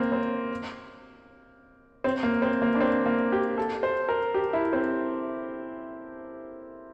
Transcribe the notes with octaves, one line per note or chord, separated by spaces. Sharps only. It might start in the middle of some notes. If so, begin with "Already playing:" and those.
Already playing: A#3 C4
C4
C4
A#3
C4
A#3
D4
C4
A#3
G4
A4
C5
A#4
G4
E4
C4